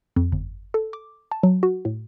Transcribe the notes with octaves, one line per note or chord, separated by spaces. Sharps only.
F2
G1
A4
D6
A5
F#3
F#4
A2